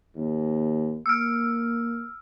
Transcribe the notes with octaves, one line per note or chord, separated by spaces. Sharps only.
D#2
A#3 E6 F6